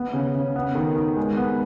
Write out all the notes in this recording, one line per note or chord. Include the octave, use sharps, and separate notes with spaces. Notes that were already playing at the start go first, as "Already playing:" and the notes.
Already playing: B3
C#3
C#3
B3
D#3
D#3
G#3
B3